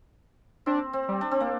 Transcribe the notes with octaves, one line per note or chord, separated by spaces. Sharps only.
C4 D4
C4
G3
D4
C4
A#3